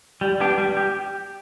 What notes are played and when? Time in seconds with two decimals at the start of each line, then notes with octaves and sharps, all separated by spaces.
0.21 G3
0.40 B3 D4 G4
0.58 G3
0.77 G4